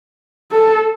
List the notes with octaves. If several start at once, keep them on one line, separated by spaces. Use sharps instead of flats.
A4